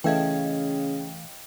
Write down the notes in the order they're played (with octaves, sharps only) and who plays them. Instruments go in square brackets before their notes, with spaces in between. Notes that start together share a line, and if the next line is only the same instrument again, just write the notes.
[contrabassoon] C#3 [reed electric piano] E3 A3 G#6 [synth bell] D#5 F5 G5